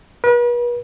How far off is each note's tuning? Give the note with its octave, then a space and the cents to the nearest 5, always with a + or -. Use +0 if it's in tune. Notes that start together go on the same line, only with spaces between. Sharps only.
B4 -40